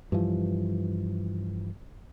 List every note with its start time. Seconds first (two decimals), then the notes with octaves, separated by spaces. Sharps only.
0.12 G2 E3 F3